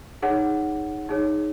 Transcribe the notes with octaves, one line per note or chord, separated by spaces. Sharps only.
D#4 G#4 C#5 F#5
D#4 G#4 C#5